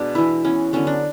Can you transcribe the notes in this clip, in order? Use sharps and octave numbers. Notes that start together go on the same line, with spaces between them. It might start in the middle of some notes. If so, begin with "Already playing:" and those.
Already playing: B2 G#3 D4
E3 B3 E4
E3 B3 C#4
D3 F#3 B3 C#4
D4